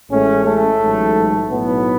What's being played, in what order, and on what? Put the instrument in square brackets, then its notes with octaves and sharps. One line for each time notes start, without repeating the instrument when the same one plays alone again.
[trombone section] A1 A2 G#3 A3 C#4
A3
A1 G#2 F#3
B1 A2 F#3 B3